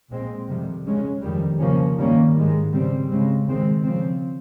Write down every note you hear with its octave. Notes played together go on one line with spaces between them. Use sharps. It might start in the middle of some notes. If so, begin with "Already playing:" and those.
A#2 G#3 C4
F2 C3 D#3 G3
C#3 G#3 C#4
F2 D#3 G3
C#3 F3 A#3 C#4
G2 D#3 G3 A#3 C#4
G#2 D#3 G#3
C#3 G3 C4
C#3 G#3 C4
C3 D#3 G#3 C4
C#3 F3 C4